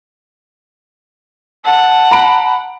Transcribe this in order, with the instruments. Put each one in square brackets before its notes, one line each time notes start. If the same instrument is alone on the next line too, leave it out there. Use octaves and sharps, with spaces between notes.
[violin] F#5 [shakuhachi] A5
[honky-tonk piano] A#5 B5 D7